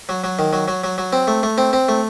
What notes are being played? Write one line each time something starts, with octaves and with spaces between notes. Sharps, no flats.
F#3
F#3
D#3
F#3
F#3
F#3
F#3
C4
A3
A3
C4
C4
A3